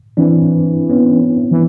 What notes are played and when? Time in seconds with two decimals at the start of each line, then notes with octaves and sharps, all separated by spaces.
0.17 E3 C4 D4
0.90 B3 C#4
1.51 E3